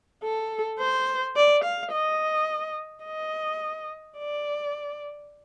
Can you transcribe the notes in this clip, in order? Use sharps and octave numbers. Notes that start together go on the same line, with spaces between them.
A4
C5
D5
F5
D#5
D#5
D5